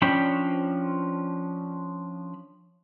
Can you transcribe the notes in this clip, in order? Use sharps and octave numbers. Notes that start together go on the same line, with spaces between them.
F3 C#4 D4 G5 B5